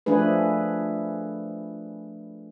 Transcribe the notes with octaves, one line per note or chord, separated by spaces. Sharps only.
F3 A3 D4 G#4 B4